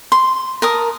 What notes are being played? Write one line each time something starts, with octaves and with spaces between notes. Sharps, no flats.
C6
A#4 A5 D#6